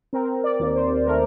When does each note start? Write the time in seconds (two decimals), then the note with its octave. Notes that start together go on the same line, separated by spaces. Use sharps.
0.13 C4 A#4
0.44 D5
0.59 D#2
0.75 C5
1.06 A3 A#4